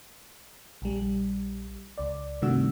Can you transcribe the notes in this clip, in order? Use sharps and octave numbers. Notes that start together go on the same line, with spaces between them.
A#1 G3
C#2 D5
G2 C3 D#3 A3 F#4 E6